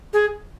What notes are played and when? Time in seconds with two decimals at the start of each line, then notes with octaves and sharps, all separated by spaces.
0.13 G#4